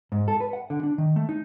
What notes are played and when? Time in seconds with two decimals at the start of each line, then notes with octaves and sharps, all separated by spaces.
0.12 G#2
0.28 A4
0.40 B4
0.53 F#5
0.70 D3
0.83 D4
0.98 D#3
1.16 A3
1.29 D#4